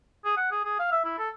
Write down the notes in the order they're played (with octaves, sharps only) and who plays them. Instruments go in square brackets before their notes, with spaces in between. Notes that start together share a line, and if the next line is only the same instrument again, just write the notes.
[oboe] G#4
F#5
G#4
G#4
F5
E5
E4
A4